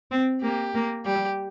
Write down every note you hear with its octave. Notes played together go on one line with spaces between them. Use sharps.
C4
A#3 G4
A#3
G3 G4